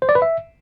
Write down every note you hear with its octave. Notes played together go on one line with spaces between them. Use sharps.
C5
D5
B4
E5